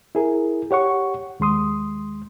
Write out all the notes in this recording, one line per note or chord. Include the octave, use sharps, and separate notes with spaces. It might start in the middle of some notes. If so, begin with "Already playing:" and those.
E4 G#4 A#4
G4 C#5 F#5 C#6
D#2 G#3 C6 D#6